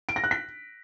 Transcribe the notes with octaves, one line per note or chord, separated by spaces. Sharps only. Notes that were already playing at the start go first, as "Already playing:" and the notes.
D7
A#6
F#6
B6